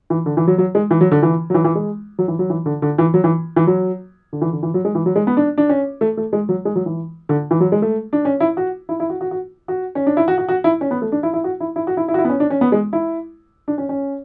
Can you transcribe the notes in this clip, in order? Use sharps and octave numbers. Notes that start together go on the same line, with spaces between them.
E3
D3
E3
F#3
F#3
G#3
E3
F#3
D3
E3
F#3
E3
E3
G#3
F#3
E3
F#3
E3
D3
D3
E3
F#3
E3
E3
F#3
D3
E3
D3
E3
F#3
G#3
E3
F#3
G#3
B3
D4
D4
C#4
A3
A3
G#3
F#3
G#3
F#3
E3
D3
E3
F#3
G#3
A3
D4
C#4
E4
F#4
E4
E4
F#4
F#4
F#4
F#4
C#4
D4
E4
F#4
F#4
F#4
E4
C#4
B3
A3
D4
E4
E4
F#4
E4
E4
F#4
E4
E4
F#4
E4
B3
C#4
D4
C#4
B3
G#3
E4
D4
C#4
C#4